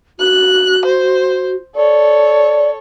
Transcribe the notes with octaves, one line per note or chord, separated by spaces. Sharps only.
F#4 F#6
C5
A4 C#5 D5